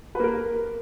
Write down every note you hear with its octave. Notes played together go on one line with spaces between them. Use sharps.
A#3 A#4 B4